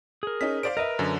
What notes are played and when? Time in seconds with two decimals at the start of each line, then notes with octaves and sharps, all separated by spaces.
0.23 G#4 A#4
0.41 C#4 D#4 B6
0.63 C5 D5 F5 D7
0.77 A#4 B4 D#5 E5
0.99 F#2 D3